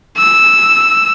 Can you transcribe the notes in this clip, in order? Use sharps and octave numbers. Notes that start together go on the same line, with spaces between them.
E6